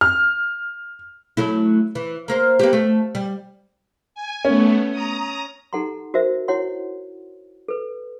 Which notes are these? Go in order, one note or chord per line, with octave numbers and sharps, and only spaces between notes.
F6
F#3 A3 E4
E3
A#3 A#4 C5
A#3 B3 G4
A3
G3
G#5
A3 B3 C#4
A#5 D#6
D#4 G4 A4 F#5 A#5 C6
F#4 A#4 C5 E5
E4 F#4 C#5 F#5 C6
A4 B4